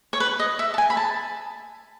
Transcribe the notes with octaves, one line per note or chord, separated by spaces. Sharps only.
C#5
B4
D#5
E5
A5
G#5
B5
A5